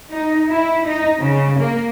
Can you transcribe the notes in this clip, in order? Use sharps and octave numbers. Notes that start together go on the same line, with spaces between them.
D#4
E4
D#4
C#3
A#3